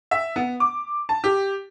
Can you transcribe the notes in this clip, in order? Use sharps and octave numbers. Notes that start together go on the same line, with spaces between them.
E5
B3
D6
A5
G4